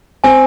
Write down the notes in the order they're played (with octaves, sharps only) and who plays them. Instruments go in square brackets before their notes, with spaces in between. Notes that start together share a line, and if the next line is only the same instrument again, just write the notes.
[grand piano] C4 [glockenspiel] G#5